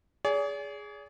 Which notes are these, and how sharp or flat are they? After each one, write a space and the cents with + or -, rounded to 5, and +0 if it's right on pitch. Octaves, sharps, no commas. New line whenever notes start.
G#4 +0 D5 -45